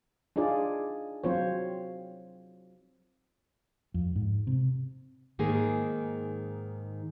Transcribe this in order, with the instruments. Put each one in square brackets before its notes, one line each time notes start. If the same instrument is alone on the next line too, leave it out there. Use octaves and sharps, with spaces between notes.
[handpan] D4 D#4 F4 G#4 D5
F#3 C4 F4 C5 C#5
[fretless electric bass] F2
G#2
C3
[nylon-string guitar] G#2 D#3 A#3 G#4